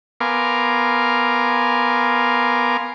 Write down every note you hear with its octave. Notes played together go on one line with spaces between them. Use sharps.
B3 A#4 F5 G#5 C6 D6